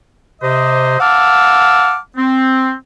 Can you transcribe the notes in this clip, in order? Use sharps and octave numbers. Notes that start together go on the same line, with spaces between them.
C3 C5 D#5
F5 F#5 A5 D6 E6 F6
C4